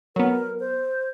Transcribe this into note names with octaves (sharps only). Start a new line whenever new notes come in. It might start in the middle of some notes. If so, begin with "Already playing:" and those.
F#3 B3 A#4
C5